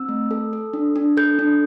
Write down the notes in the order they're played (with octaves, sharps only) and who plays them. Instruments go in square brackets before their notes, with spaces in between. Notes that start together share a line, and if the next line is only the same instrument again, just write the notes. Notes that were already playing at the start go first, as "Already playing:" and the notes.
Already playing: [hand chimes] C4 E6
A3
A4
A4
D4
D4
A4 G6
D4